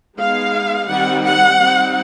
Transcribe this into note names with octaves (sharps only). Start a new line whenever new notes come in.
G#3 B3 D#4 F5
D#3 G3 C4 D#4 F#5
F#5
G3 C4 D#4